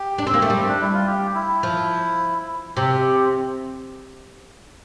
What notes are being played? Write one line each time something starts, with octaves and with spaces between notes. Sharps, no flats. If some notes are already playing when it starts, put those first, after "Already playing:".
Already playing: G4
D4
C4
A#3
A3
G3
C4
D4
E4
F4
G4
E4
F3
C3 G4